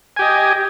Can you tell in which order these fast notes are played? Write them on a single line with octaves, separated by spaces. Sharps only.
G#5 G4 D#5